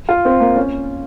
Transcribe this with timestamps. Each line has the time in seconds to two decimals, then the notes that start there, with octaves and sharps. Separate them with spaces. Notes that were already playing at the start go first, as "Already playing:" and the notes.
0.09 F4
0.25 C4
0.40 A#3
0.56 C#4